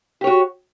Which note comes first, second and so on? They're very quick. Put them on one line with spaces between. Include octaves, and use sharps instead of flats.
G4 C#5 F#4